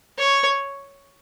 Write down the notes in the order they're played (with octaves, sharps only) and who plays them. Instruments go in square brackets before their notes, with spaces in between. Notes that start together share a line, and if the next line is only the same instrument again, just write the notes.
[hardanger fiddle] C#5